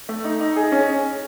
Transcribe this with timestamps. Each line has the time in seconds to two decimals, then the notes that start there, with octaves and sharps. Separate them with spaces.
0.09 A3
0.24 D#4
0.41 D#4
0.56 G#4
0.72 C#4